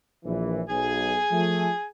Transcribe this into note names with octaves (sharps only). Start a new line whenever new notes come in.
A#1 E3
B1 G#4 G#5
F3 A3